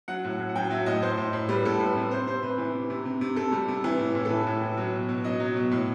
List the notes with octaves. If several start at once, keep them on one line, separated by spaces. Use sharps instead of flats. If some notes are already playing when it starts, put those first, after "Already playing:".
F#3 F#5
A2
A2
F#5
F#3 G5
F#3 E5
A2 D#5
A2 C5
A2
A2
G3 B4
A2 A4
A2 B4
C3 B4
C3 C5
C3 C5
C3 B4
E3
C3
C3
C3
C3
C3 A4
G3
C3
E3
A2
A2
A4
E3 B4
A2
E3
F#3
B2
B2
F#3 D#5
F#3
B2
A2